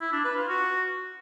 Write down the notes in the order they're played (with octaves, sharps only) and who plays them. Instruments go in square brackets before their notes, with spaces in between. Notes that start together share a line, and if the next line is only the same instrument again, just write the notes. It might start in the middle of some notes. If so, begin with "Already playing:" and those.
[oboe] E4
D4
B4
F4
F#4